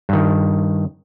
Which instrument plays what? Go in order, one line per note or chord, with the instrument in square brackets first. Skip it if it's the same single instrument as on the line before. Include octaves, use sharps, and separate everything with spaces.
[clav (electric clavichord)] G2 D#3